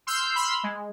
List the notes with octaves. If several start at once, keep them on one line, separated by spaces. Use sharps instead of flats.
C6 E6 F6 G6
B5 C6 E6 F6
G#3